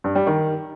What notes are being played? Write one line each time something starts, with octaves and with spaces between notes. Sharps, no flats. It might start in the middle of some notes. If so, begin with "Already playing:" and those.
G2
G3
D#3